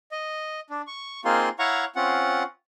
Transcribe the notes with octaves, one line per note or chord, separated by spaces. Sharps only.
D#5
D4
C#6
A#3 C4 D#4 F4 G#4 C6
E4 C#5 F5 F#5 A#5 C#6
C4 C#4 F4 F#5